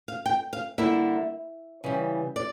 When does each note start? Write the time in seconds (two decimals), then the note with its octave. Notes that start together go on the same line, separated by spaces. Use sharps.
0.08 F5
0.26 G5
0.53 F5
0.78 D3 G3 A#3 E4 E5
1.84 C#3 E3 G3
2.36 D5